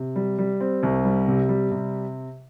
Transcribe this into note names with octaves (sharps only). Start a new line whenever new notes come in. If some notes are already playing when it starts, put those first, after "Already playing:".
Already playing: C3
G3
G3
C4
C2
G3
C3
G3
C3